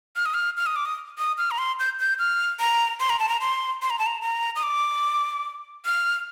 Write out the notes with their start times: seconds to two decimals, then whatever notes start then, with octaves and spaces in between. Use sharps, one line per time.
0.16 F6
0.26 D#6
0.34 F6
0.57 F6
0.66 D#6
0.76 D6
0.85 D#6
1.18 D#6
1.38 F6
1.51 A#5
1.58 C6
1.79 G6
1.99 G6
2.19 F6
2.60 A#5
3.00 C6
3.09 A#5
3.19 A5
3.29 A#5
3.41 C6
3.82 C6
3.90 A#5
3.99 A5
4.06 A#5
4.22 A#5
4.56 D#6
4.63 D6
5.85 F6